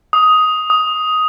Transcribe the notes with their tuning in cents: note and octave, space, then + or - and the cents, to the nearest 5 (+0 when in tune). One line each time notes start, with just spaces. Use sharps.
D#6 +10
D#6 +10